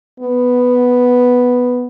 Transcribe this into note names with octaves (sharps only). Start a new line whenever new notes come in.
B3